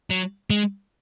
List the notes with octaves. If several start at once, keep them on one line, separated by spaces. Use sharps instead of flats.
F#3
G#3